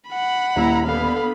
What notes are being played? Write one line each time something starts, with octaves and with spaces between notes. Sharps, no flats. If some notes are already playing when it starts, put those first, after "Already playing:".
F#5 B5
D#1 E4 A#5
D3 B3 F5 B5